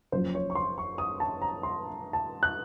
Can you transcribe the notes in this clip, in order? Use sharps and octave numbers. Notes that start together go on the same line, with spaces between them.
F#1 F#2 F3 C5
C#5
C#6
C6
C#6
D#6
A5
A#5
C6
A5
F#6